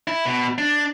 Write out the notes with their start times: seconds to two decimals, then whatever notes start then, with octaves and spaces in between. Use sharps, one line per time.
0.08 E4
0.26 B2
0.58 D4